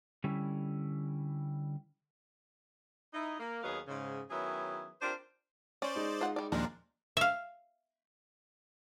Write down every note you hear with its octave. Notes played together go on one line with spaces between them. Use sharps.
D3 G3 C#4 E4
D#4 E4
A#3
D#2 F#3 B3 D#4 G#4 F5
G#2 C#3
D#3 F#3 B3 C#4 E4 G#4
C4 D4 F4 G4 A#4 C5
C#4 C5 D5
G#3 D#4
F4 F#5
G3 D5
D#2 A#2 F3 G#3 D4 A#4
E5 F5